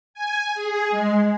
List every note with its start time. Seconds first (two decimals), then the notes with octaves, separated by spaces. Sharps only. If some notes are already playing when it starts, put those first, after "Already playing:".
0.14 G#5
0.54 G#4
0.90 G#3